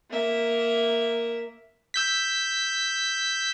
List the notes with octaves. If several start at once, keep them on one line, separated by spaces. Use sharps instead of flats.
A#3 E5
E6 G6 B6